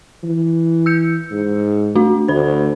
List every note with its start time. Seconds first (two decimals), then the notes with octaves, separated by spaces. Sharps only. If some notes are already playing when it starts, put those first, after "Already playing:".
0.24 E3
0.86 E6 G6 C#7
1.31 G#2
1.95 A3 D4 F#4
2.28 D2 C5 B5